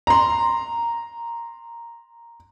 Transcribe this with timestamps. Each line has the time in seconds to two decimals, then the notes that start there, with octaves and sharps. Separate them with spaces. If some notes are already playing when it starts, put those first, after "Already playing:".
0.07 A#5 C6